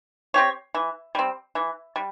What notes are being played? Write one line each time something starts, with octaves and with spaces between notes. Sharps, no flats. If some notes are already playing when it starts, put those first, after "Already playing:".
C4 G4 C#5
E3
G3 C4
E3
G3